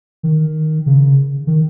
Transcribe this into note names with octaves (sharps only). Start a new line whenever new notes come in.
D#3
C#3
D#3